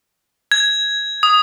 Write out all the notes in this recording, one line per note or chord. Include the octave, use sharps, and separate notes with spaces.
G#6
D#6